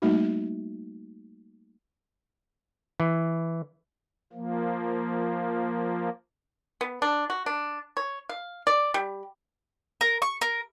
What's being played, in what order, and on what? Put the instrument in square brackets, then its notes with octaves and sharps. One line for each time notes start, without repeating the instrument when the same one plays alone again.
[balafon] G3 A3 A#3 D#4 F#4
[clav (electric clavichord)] E3
[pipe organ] F3 A#3
[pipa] B3
D4
F#4
D4
C#5
F5
D5
G3
[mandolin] A#4
C#6
A#4